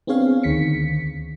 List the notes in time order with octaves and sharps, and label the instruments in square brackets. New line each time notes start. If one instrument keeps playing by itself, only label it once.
[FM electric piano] B3 C4 D4 G#4 C#5 F5
D2 D#3 B6 C#7